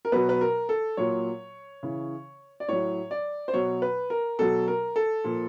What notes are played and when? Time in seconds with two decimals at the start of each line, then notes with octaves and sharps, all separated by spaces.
0.05 A#4
0.12 B2 F#3 B4
0.29 B4
0.41 A#4
0.69 A4
0.97 A#2 F#3 C#5
1.83 C#3 E3
2.60 D5
2.68 A2 F#3 C#5
3.11 D5
3.48 C5
3.54 B2 F#3 C#5
3.82 B4
4.10 A#4
4.39 B2 F#3 A4
4.68 A#4
4.96 A4
5.24 A#2 F3